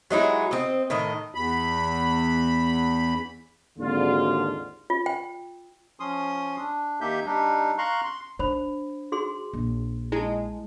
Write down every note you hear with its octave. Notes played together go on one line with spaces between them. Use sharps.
F#3 G#3 D#4 E4
C4 D#5
A2 D#3 D#5
E2 B5
G#1 D#2 D3 F4
F4
G5
F3 C#4 C6 D#6
D4
D#2 A#3 D#4 G4 E5 G6
G3 D4 D#4
F5 A#5 C6 C#6 F#6
C6
D4 C5 B5
F#4 G#4 C6
A#1
G#3 E4 A5